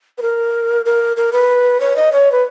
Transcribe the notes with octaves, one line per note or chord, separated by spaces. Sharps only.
B4
A#4
A#4
A#4
B4
C#5
D#5
C#5
B4